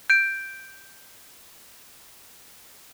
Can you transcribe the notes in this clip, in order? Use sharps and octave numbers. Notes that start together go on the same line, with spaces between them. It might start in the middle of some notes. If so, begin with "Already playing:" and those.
G6 D7